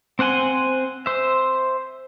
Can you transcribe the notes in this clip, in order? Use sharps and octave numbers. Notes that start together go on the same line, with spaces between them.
C4 C5 F#5 G#5 C6
C5 E5